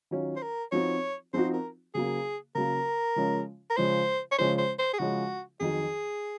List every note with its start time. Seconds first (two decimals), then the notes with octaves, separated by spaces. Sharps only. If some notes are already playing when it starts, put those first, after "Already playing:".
0.11 D#3 F#3 C#4 F4
0.37 C5
0.43 A#4
0.72 F3 C4 D#4 F#4 C#5
1.33 F3 C4 D#4 F#4 C5
1.54 A#4
1.95 C#3 F#3 A#3 G#4
2.55 C#3 F#3 A#3 A#4
3.16 C#3 F3 G#3 C#4
3.70 A#4
3.77 C#3 F3 G#3 C#4 C5
4.32 C#5
4.39 C#3 F3 G#3 C#4 C5
4.58 C5
4.79 C5
4.94 G#4
4.99 C#3 F3 G#3 C#4 F#4
5.60 F2 D#3 F#3 G#4